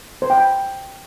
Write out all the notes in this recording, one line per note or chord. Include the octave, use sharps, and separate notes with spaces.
C5
G5
B5